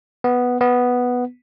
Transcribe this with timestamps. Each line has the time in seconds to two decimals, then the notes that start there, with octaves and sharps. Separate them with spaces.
0.24 B3
0.61 B3